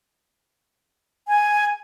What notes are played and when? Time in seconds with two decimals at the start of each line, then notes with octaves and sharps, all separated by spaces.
1.28 G#5